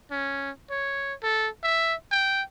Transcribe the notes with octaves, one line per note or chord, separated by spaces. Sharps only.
C#4
C#5
A4
E5
G5